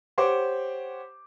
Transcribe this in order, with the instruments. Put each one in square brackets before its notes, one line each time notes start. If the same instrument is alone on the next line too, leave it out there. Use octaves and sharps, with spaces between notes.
[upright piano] G4 C5 C#5 F#5 D6